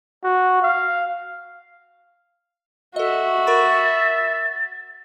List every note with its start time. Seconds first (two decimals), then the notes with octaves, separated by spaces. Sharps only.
0.24 F#4
0.62 F5
2.96 F#4 A4 D#5 E5
3.47 A#4 B5 C#6 A6